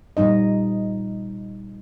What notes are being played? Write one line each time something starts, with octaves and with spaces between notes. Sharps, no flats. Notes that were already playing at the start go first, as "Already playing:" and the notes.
A#2 F3 G3 D#4 D#5